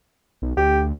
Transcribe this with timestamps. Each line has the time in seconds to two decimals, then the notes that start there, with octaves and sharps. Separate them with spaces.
0.42 B1
0.57 D2 G4